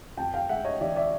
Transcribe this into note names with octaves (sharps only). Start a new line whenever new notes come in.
F2 G5 A5
F5 G5
G#3 E5 F#5
C#5 D#5
E3 D5 E5
D5 E5